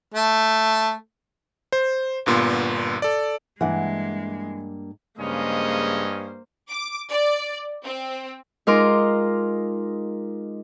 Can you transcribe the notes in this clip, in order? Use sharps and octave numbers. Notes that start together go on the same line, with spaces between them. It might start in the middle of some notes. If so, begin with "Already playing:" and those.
A3
C5
G1 G2 A#2 B3 C6
A4 D5
G2 E3 G#3 A#3 F#5
G2 C#3 G#3 A#3 C#4 C5 D#5
D6
D5
C4
G#3 D#4 F4 A#4 C6 D6